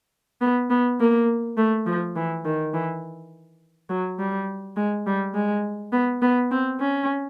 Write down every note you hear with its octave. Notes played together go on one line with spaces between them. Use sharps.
B3
B3
A#3
A3
F3
E3
D#3
E3
F#3
G3
G#3
G3
G#3
B3
B3
C4
C#4